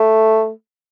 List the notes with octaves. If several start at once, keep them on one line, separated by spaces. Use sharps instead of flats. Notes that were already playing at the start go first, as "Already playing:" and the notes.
Already playing: A3